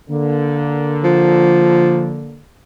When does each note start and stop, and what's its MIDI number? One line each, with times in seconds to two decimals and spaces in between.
0.10 2.41 50
0.10 2.41 58
1.04 2.22 53